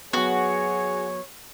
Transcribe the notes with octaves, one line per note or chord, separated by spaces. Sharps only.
F#3 B3 F#4 G#4 C#5